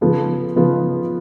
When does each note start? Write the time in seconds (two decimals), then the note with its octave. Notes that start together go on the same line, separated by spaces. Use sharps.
0.01 C#3 F3 B3 F4 A4
0.56 C#3 F3 B3 F4 A4